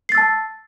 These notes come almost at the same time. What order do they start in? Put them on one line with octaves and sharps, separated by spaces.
C7 A6 E6 A5